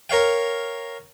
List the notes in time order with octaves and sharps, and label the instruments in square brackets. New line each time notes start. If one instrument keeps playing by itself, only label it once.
[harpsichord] A#4 C#5 F5 G5